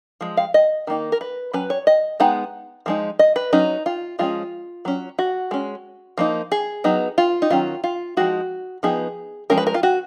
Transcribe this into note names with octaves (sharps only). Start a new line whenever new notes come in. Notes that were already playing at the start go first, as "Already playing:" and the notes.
F3 G#3
F5
D#5
D#3 A#3 D#4
A#4
B4
F#3 C#4 B4
C#5
D#5
G#3 B3 D#4 F#5
F3 G#3 D#4
D#5
B4
F#3 C#4 D#4
F4
F3 G#3 C#4 F4
F#3 C#4
F#4
G#3 C#4
F3 A#3 D#4
G#4
F#3 B3 D#4
F4
D#4
D#3 F#3 C#4 F4
F4
F3 G#3 D#4 F#4
F3 B3 D#4 G#4
F3 G#3 C#4 A#4
B4
A#4
F4
F#4